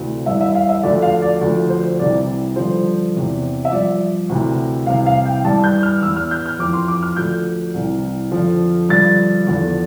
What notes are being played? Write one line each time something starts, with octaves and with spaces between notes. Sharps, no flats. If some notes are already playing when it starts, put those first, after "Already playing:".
Already playing: D2 C3 E3
G2 E3 E5
E5
F5
E5
D2 D3 F3 D5
F5
D5
D2 D3 F3
C5
C2 C3 E3 D5
G2 D3 F3 C5
E2 C3 E3
E5
G2 F3 D5
D2 C3 E3
C2 C3 E3 F5
F5
G5
G2 E3 A5
G6
F6
E2 E3 E6
F6
G6
F6
F2 E3 D6
C6
D6
F6
D2 D3 F3 G6
C2 C3 E3
F2 D3 F3
G2 D3 F3 A6
E2 D3 F3